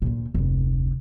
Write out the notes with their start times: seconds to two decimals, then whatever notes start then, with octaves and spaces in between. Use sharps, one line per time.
0.02 D2 A#2
0.34 F1 D2